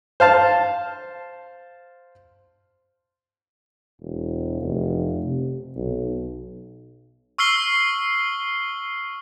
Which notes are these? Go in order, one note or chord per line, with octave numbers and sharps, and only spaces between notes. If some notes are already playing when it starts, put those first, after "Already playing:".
C5 F5 A5
E1
F1
C3
B1
C#6 E6 F6 C7 G7